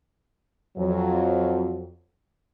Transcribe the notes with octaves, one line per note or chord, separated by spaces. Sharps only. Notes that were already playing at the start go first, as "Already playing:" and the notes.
F2 F#3